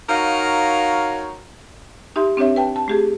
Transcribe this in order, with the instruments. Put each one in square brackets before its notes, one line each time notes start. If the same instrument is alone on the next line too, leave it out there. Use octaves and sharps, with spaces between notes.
[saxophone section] D#4 F4 F#4 A#4 C#5 F5
[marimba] D#4 G4 E5 C6
C4 D4 G4 C#5 E5
B4 G5 A5
A5
A3 G4 G#4